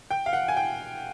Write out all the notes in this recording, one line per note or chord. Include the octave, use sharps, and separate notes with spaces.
G5
F5
F#5
G#5
G5